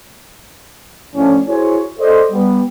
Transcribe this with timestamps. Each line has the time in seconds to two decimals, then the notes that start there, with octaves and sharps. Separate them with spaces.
1.16 A2 F3 C#4 D4
1.48 E4 F#4 G#4 C5 C#5
2.00 A4 C5 D5 D#5
2.32 G3 B3